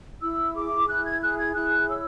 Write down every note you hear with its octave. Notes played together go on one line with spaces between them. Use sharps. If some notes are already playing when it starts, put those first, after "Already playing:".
E4 E6
G#4 D6
E4 F#6
G#6
G#4 F#6
G#6
E4 F#6
C#5 E6